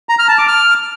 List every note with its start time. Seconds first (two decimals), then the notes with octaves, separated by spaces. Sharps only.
0.09 A#5
0.19 F6
0.28 A5
0.38 D6
0.48 F6